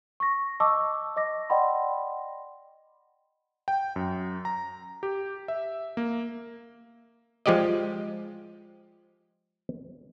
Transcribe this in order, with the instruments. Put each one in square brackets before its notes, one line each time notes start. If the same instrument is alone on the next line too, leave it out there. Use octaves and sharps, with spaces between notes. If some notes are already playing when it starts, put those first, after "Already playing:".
[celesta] C#6 A#6
D#5 A5 C#6 D6 E6
D#5 D6 A#6
D5 D#5 F#5 G5 B5 C6
[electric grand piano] G5
F#2
A#5
G4
E5
A#3
[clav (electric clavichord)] F3 G#3 G4 D5 D#5